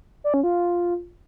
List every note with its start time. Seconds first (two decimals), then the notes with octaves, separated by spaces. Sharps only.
0.24 D5
0.34 C#4
0.43 F4